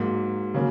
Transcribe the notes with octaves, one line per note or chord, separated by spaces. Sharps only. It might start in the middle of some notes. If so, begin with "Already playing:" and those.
Already playing: G#2 F#3 A#3
C#3 F#3 A#3